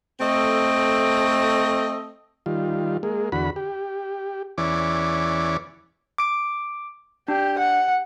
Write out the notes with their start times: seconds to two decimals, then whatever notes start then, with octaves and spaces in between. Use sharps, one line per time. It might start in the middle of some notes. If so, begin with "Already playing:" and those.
0.20 A3 C4 A4 D#5
2.46 D#3 G3 F4
3.03 G#3 A#3
3.32 E2 D3 F#4 B5
3.56 G4
4.58 E2 E3 C#4 D5
6.18 D6 D7
7.28 D4 G4
7.58 F#5